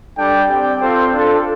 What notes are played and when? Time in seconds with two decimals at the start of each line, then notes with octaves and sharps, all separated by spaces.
0.18 G3 D4 A4 D5 G5
0.49 C4 G4 D5 G5
0.80 C4 F4 A4 C5
1.13 D4 F4 A4